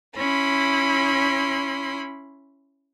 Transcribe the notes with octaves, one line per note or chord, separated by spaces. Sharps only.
C#4 E4 B5 C6